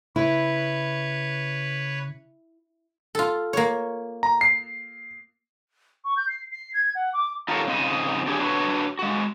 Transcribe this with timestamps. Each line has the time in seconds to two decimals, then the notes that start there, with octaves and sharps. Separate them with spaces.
0.16 C#3 E4 B4 C#5
3.15 F4 A4
3.53 A#3 C#5
4.23 A#5
4.41 C7
6.05 C#6
6.17 G6
6.29 C7
6.51 C7
6.74 G#6
6.95 F#5
7.14 D6
7.48 D#4 F4 G4 A4 A#4 C#5
7.67 F2 C#3 D#4 C5 D#5
8.27 D4 G4 G#4 B4 C#5
8.40 D4 F#4 G#4 B4 C#5
8.99 G#3 F#4